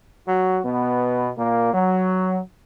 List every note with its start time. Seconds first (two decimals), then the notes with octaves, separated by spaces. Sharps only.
0.28 F#3 F#4
0.64 B2 B3
1.38 A#2 A#3
1.73 F#3